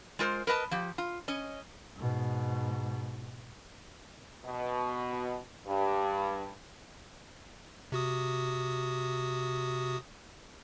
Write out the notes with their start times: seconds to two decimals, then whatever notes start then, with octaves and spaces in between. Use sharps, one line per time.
0.19 G#3 F4 A#4 C5
0.47 A#4 B4 D#5 A5
0.71 F3 G4
0.98 F4
1.28 C#4 D#5
1.97 G#2 B2
4.46 B2
5.67 G2
7.92 C3 F#4 D#6